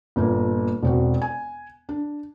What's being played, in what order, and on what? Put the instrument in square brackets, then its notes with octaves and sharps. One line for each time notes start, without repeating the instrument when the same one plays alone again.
[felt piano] G1 A#2 A#3
E1 C4 F#4
G#5
D4